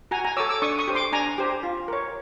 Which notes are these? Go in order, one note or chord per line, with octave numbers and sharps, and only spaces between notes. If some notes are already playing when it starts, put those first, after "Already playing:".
F#4 G#5 A#5
G#5 A#5
A4 C#5 D6 E6
D6 E6
D4 C#6 D#6
C#6 D#6
G4 C5
C6 D6
D4 G#5 A#5
G4 C5
F4
A#4 C#5